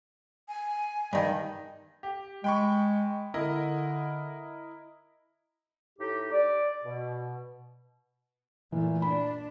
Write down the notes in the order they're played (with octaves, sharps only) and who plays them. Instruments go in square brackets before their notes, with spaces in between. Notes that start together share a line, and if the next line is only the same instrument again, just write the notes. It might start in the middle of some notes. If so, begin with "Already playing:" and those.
[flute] G#5
[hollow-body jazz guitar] G2 D#3 [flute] D#5
[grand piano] G4
[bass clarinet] G#3 [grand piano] G5 B5 C#6
[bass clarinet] D3 [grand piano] E4 A#4 D#5
[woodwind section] A2 D#4 G4
D5
B2
[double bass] A#2 A3 [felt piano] E3
[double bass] D4 [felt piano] B5